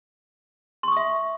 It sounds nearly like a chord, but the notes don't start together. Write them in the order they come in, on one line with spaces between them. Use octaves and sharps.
C6 C#6 D#6 E5